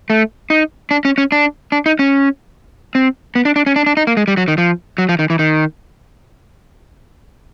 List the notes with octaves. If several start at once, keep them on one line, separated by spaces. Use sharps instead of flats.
A3
D#4
D4
C#4
C#4
D4
D4
D#4
C#4
C4
B3
D4
D4
C#4
D4
D4
D#4
A#3
G#3
G3
F#3
D#3
F3
F#3
F3
D#3
E3
D#3